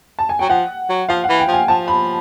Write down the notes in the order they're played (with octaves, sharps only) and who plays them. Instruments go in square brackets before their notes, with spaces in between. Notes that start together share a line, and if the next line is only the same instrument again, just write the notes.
[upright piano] A5
G#5
[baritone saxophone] F#3 [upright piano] G5
[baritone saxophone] F3 [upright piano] F#5
[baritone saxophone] F#3
[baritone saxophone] F3 [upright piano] F5
[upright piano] F#5
[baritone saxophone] E3
[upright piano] G5
[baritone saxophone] F3
[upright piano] G#5
[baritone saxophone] F3 [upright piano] A5
[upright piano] B5